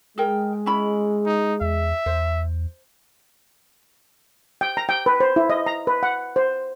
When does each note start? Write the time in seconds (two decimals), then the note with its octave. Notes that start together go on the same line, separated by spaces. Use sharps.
0.18 G#3 G#4 A#4 G5
0.66 C#4 E4 B5
1.26 D#4
1.61 E2 E5
2.06 E2 C5
4.61 G5
4.77 A#5
4.89 G5
5.06 B4
5.20 C5
5.36 E4
5.50 D#5
5.66 A#5
5.87 B4
6.03 F#5
6.36 C5